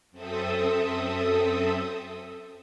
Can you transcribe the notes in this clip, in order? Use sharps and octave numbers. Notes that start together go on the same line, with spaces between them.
F#2 C4 A4 E5 D#6